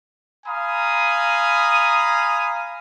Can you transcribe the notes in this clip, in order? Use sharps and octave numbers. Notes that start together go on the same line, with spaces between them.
F5 G#5 A#5 B5 D#6